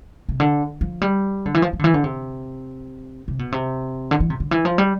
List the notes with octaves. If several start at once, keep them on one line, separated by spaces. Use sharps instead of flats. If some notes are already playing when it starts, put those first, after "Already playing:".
C3
D3
F3
G3
D3
E3
F3
F3
D3
E3
D3
C3
C3
B2
C3
D3
E3
C3
D3
E3
F3
G3